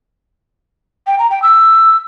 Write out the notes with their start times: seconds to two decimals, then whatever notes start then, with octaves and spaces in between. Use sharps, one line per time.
1.07 G5
1.19 A#5
1.31 G5
1.42 E6